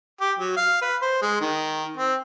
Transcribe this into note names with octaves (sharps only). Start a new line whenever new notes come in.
G4
F#3
F5
B4
C5
G#3
D#3
C4